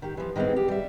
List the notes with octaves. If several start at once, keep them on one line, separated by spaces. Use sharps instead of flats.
D#3 G4
E3 F3
D#3 E3 G#3 B3 C4
G4
G3 E5